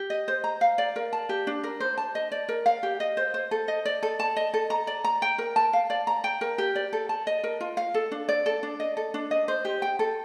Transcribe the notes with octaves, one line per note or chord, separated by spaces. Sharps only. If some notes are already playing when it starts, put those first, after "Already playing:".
Already playing: G4
D#5
C5
A#5
F5
D5
A#4
A5
G4
D4
A#4
C5
A5
D#5
D5
A#4
F5
G4
D#5
C5
C5
A4
D#5
D5
A4
A5
D#5
A4
A#5
D5
A#5
G5
A#4
A5
F5
D5
A#5
G5
A#4
G4
D5
A4
A5
D#5
A#4
F4
F5
A4
D4
D5
A4
D4
D#5
A4
D4
D#5
C5
G4
G5
A4